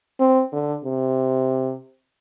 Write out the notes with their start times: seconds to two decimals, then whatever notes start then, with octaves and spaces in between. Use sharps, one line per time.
0.20 C4
0.53 D3
0.84 C3